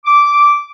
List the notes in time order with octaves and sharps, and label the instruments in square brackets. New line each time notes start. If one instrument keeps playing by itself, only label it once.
[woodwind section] D6